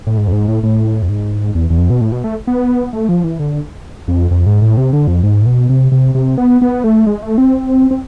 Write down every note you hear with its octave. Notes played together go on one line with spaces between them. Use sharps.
A2
G#2
F2
G#2
A2
A2
F2
G#2
E2
E2
F2
B2
A2
B2
A3
B3
A3
F3
E3
D3
F2
F2
G#2
A2
C3
D3
F2
G#2
A2
B2
C3
C3
C3
B3
B3
A3
G#3
A3
C4
C4